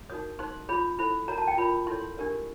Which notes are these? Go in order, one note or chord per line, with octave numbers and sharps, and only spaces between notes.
D#4 F#4 A#4 C#5 D#6
D#4 G#4 C5 C6
F4 G#4 C#5 B5
E4 A4 C5 B5
F#4 A#4 C#5 A#5
A5
G5
F4 A#4 C#5 B5
E4 A4 C#5 C6
D4 G4 A#4 C#5